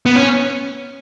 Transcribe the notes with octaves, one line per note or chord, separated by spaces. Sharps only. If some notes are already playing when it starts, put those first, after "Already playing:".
B3
C#4